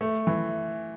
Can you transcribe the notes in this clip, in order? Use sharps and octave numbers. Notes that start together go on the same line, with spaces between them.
A3
E3